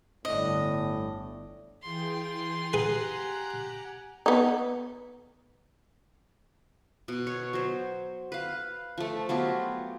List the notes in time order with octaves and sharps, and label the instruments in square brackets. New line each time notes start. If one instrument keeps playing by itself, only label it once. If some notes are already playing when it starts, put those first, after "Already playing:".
[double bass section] G1 [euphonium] A2 [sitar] D4 [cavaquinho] D#5
[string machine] E3 G#4 G5 [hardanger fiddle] F4 C6
[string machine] G4 F#6 [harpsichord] G#4 B4 [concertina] F#5 G#5 A#5
[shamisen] B3 D#4
[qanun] B2
C#5
F#3 C5
B4 F5
F3 A3
F#3 B3 F4 G4